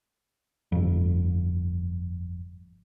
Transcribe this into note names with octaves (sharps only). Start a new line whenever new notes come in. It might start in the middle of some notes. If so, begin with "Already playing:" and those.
G1 F2